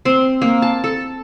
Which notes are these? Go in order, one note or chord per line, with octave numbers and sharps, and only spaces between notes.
C4
A#3
A5
A4